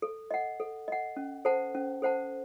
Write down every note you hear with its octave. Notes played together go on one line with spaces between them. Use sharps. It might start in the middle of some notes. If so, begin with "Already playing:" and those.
A4
D#5 F#5
A4
D#5 F#5
C#4
A4 C5 F#5 A5
C#4
A4 C5 F#5 A5